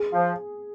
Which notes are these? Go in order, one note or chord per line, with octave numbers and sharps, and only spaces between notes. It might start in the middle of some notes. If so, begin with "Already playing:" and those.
Already playing: G#4
F3